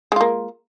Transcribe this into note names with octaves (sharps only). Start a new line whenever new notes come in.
G#3 A#3 F4